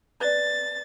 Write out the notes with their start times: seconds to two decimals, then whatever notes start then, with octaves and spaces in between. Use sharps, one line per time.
0.21 B4 D5 A6